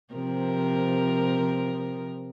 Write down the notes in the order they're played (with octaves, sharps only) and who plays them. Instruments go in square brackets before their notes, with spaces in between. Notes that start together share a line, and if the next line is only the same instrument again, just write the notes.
[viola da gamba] C3 F3 A#4